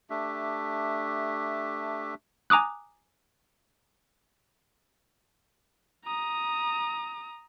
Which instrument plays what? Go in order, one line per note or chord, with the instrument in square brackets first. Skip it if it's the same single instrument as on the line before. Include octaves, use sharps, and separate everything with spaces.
[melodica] A3 D4 G4 E5
[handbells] G#5 A#5 D6 D#6 F#6
[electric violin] A#5 D#6